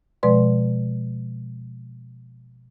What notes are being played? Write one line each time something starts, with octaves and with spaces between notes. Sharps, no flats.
B2 F3 G#3 B4 D5 C6